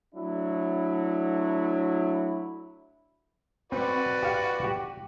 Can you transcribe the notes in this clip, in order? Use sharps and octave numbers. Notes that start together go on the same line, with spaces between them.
F#3 A3 D4 E4
C4 F#4 B4 D5
G4 F5 F#5
G4